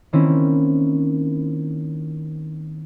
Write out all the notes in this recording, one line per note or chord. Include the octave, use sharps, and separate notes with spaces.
D#3 A#3 C4 C#4 E4